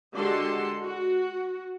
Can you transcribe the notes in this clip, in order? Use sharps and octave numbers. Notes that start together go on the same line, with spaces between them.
D3 G#3 F#4 G4 A4 C6
F#4